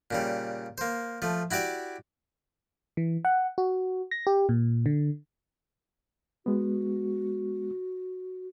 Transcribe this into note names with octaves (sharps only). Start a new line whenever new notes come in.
A#2 C#3 G3
A#3 C5
F3 A3
E4 F#4 G4 D5 E5
E3
F#5
F#4
A#6
G4
A#2
D3
G#3 B3 F#4